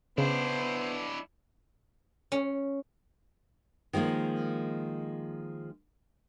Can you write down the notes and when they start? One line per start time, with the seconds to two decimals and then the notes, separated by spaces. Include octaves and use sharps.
0.18 C#3 B3 D4 E4 C5
2.32 C#4
3.93 D#3 F3 G#3 A#3